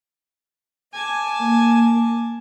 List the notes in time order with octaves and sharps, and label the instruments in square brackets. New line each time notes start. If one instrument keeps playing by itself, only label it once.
[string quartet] G#5 A5 D6
[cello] A#3